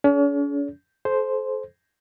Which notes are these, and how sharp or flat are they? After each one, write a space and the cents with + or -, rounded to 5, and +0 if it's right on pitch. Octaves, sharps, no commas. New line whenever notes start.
C#4 +45 G#4 +40 C#5 +40
A4 -35 C5 +0